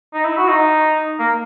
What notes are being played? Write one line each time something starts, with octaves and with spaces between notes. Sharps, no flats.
D#4
E4
F#4
D#4
A#3